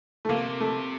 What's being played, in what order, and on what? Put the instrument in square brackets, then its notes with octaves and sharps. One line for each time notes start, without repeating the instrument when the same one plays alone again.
[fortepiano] A3
[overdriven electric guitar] C3 [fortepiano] A#3
[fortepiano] A3